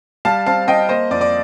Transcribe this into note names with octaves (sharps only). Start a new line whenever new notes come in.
G3 F5 A5
C4 F5 A5
C4 D#5 G5
A#3 C5 D#5
F2 D5
D5